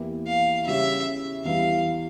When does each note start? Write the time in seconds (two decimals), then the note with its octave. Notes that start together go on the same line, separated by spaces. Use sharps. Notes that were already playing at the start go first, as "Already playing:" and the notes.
Already playing: E2 E3 A#3 E4 G4
0.27 F5
0.66 C#3 G3 C#4 G4 C#5 E5
1.44 E2 E3 G3 F5